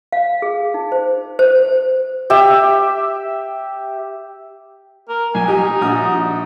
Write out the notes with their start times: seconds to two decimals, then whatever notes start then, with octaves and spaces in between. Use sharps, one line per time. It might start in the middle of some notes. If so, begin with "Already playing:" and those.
0.12 F5
0.42 G#4
0.74 D#4
0.92 C5
1.39 C5
2.30 G4 E5
5.09 A#4
5.35 B1 G#5
5.48 D#4 G4
5.81 A#1 F#4 D#6